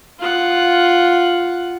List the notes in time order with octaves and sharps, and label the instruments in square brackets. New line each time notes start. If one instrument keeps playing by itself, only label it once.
[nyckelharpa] F4 F#5